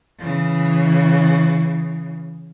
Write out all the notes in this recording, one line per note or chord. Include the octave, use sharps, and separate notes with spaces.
C#3 E3